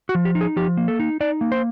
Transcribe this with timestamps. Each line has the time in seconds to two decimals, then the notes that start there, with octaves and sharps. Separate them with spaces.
0.09 F#4
0.15 F3
0.25 G4
0.35 D#4
0.41 G#4
0.56 F3 G4
0.77 A#3
0.88 A4
0.99 D#4
1.20 D#4 D5
1.41 A#3
1.52 C5